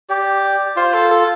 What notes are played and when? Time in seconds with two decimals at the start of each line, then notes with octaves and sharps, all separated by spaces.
0.09 G4 D5
0.76 F4 C5
0.94 A4
1.11 A4